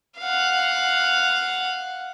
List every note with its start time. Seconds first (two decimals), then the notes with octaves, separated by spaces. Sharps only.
0.19 F5 F#5